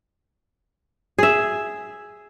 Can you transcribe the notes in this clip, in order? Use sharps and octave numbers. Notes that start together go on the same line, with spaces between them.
G#4 E5